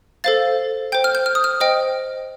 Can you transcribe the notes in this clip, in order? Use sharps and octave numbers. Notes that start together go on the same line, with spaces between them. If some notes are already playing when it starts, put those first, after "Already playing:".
A4 C5 F5 A6
C5 G5 G6
F6
G6
F6
D#6
F6
C5 D#5 G5